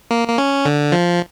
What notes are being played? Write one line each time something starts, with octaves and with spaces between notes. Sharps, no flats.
A#3
A#3
C#4
D3
F3